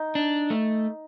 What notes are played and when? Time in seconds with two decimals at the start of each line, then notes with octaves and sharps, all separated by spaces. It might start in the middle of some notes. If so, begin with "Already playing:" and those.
Already playing: D#4
0.15 D4
0.50 A3